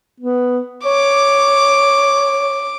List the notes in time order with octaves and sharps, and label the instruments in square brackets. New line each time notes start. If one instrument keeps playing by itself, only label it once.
[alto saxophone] B3
[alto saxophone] C#5 [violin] D6